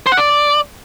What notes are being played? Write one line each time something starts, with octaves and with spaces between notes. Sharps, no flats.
C5
F#5
D5